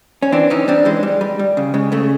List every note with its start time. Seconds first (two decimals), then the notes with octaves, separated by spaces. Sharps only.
0.22 C#4
0.32 E3 C4 D4
0.50 E3 C#4 D#4
0.68 G3 C4 D4
0.85 E3 G#3
1.03 G3
1.21 G3
1.39 G3
1.57 C#3
1.74 C#3 G#3
1.92 C#3 A3